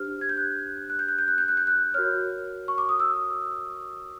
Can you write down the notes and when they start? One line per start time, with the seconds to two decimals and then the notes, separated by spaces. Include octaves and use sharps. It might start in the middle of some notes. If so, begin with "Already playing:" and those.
Already playing: D4 G4 C5 F6
0.21 G#6
0.29 G6
0.37 F#6
0.90 F#6
0.99 G6
1.09 F#6
1.18 G6
1.28 F#6
1.38 G6
1.48 F#6
1.57 G6
1.67 F#6
1.94 F#4 A#4 C#5 F6
2.68 C#6
2.78 D6
2.89 D#6
3.00 E6